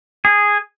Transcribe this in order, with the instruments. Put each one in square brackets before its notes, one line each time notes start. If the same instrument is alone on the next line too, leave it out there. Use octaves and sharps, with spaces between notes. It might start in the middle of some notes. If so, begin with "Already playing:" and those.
[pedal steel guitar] G#4